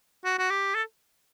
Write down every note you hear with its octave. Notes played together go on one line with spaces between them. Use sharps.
F#4
F#4
G4
A4